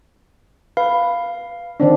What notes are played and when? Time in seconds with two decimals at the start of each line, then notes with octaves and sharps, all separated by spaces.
0.77 B4 F5
1.80 D#3 C4 D4